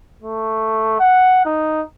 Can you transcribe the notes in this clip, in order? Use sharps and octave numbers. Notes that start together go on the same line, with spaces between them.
A3
F#5
D#4